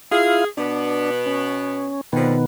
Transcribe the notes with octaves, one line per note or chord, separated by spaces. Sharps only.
E4 F4 G#4 F5
B2 B3 D4
C#4
F2 B2 D3 D#3 F3 B3